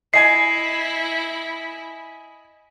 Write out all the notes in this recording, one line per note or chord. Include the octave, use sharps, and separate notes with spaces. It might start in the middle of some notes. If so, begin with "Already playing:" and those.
E4 D#5 G#5 G#6 C7